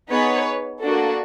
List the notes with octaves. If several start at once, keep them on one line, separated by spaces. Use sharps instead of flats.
B3 D#4 G#4 B4 C#5
A#3 D4 F#4 A4